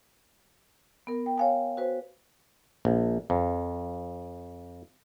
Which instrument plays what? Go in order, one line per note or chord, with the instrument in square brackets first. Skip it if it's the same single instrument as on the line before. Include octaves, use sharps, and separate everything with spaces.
[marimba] B3 A#4
G5
C#5 F5 G#5
F#4 B4 C5
[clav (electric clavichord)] A#1
F2